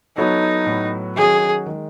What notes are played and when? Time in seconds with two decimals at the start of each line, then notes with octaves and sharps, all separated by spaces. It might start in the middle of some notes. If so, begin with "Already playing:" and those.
0.18 F#3 B3 D#4 F#4 A4 C#5
0.66 A2 F#3 B3 F#4
1.16 D#3 F#3 C#4 F#4 G#4
1.66 D#3 G#3